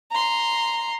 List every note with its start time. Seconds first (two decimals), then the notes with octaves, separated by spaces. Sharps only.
0.11 A#5 C6